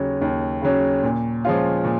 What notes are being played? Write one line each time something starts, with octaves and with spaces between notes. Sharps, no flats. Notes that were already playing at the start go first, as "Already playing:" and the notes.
Already playing: D#2 C#3 F#3 C#4
D#2
C#3 F#3 C#4
A#2
F3 G#3 C#4 F4
A#2